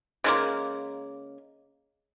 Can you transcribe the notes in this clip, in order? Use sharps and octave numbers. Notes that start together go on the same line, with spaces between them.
C#3 G#3 A#3